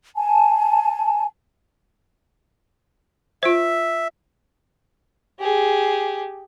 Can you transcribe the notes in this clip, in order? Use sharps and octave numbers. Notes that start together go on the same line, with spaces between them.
G#5 A5
F4 C5 E5
G4 G#4